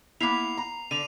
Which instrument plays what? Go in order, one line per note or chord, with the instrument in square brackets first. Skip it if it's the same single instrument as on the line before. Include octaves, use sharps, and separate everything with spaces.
[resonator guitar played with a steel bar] A#3 B3 E4 [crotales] C7 F7
[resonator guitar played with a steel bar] A#5
[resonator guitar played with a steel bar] D3 [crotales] D#7 F7